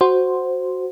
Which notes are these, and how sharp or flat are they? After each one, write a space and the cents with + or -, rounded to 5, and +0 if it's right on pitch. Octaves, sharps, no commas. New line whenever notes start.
F#4 +0 C5 +0